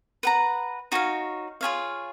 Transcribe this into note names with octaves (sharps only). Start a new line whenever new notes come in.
B4 F#5 A#5
D#4 F#4 C#5 F5
F4 G#4 C#5 F5